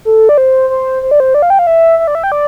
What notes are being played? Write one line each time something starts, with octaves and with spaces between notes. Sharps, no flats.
A4
D5
C5
C5
C5
D5
C5
D5
F5
G5
F5
E5
E5
D5
E5
G5
D5